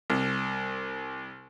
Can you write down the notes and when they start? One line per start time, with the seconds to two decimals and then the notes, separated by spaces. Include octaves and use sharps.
0.10 C2